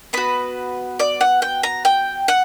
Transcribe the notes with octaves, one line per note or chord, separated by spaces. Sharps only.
B3 F#4 B4
D5
F#5
G5
A#5
G5
F#5